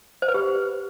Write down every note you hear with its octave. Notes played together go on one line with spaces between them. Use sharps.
C5
B4
G4